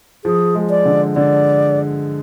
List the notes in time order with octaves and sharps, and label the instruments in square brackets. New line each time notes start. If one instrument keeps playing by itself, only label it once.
[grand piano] F3 [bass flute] G#4
[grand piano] G#3
[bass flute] D5
[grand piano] D3
[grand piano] D3 [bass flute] D5